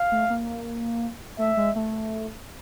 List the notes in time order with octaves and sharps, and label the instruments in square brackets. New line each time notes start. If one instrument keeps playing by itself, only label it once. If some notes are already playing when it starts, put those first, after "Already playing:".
Already playing: [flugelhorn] F5
[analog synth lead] A3
A#3
[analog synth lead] A3 [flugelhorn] E5
[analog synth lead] G#3
A3